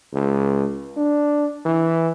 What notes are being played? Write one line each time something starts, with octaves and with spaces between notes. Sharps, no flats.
C#2
D4
E3